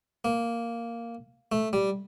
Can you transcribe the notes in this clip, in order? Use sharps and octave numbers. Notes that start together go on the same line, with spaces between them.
A#3
A3
G3